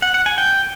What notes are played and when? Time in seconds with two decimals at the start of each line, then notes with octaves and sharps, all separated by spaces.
0.02 F#5
0.14 F#5
0.26 G#5
0.38 G5